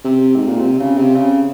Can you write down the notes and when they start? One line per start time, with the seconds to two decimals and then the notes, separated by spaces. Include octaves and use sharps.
0.04 C3
0.35 G#2
0.48 A#2
0.60 C3
0.79 C#3
0.97 C3
1.16 C#3